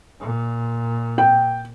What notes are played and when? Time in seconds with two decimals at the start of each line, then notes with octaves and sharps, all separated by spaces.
0.20 A#2
1.18 G5